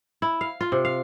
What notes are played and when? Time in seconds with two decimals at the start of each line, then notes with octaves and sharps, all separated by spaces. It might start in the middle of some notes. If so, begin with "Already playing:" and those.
0.22 E4
0.41 F5
0.61 F4
0.72 C3
0.85 F5